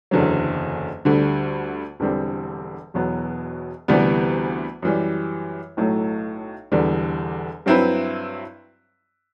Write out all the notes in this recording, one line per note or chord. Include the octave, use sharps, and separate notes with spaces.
F#1 E2 D3 F#3
D2 D3 G3
E1 E2 D3 G3 C4
E1 E2 B2 F#3 B3
D2 C3 E3 G3 B3
F#2 E3 G3
B1 A2 F#3 A3
E1 E2 D3 G3
G2 F#3 C4 E4 B4